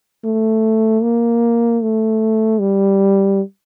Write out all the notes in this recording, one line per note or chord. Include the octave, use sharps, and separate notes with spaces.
A3
A#3
A3
G3